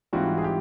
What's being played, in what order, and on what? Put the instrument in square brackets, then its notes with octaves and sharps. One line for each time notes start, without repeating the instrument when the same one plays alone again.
[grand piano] G#2 E3 G3 C4 F4 F#4
G#4
G4